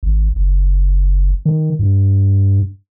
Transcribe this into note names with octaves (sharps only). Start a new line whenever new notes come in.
G#1
F#1
D#3
G2